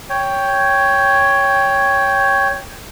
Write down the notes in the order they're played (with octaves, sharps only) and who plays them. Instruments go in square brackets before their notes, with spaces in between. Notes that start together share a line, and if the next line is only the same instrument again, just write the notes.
[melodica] C#5 G5